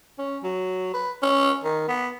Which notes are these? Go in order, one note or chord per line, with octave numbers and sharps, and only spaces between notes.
C#4
F#3
B4
C#4
D#3
B3